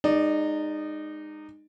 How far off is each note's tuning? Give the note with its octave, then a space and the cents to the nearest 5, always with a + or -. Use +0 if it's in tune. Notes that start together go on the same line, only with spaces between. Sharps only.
G#3 -15 D#4 -20 D5 +0